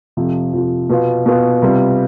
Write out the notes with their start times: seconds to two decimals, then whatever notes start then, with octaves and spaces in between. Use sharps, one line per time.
0.17 F2 C3 F3
0.53 F2 C3 F3
0.89 B2 B3 F4
1.26 B2 B3 F4
1.62 C3 G3 B3 F4